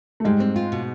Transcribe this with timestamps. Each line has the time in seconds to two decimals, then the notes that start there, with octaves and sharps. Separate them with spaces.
0.20 A3
0.24 G#2 G3 G#3
0.40 C4
0.56 F4
0.72 B2